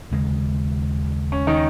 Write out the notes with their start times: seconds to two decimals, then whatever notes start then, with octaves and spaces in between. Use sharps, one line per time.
0.11 D#2 C#3 G#3
1.32 C#4
1.47 D#3 D#4